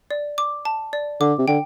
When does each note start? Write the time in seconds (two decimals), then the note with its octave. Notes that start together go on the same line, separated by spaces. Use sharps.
0.11 D5
0.38 D6
0.65 A5
0.93 D5
1.20 D3 D6
1.38 C3
1.48 D3 G5